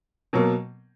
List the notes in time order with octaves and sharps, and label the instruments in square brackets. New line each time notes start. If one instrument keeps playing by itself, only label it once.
[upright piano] B2 F#3 A#3